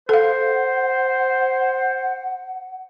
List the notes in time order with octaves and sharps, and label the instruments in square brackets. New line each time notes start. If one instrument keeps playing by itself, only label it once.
[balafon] A4 F5 [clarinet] C5 [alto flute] F#5